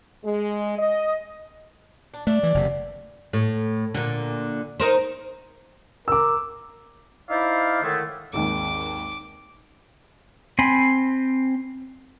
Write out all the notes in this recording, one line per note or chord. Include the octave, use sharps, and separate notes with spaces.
G#3
D#5
D4
A3 D4
E3
F#1 C3
A2
A#2 D3
D#4 A#4 C5
A#4 D6 E6
D#4 E4 C5 D5 E5 F5
A2 D3 D#3 G#3 A3
G#1 D#2 G#2 D6
C4 G#5 B5 C6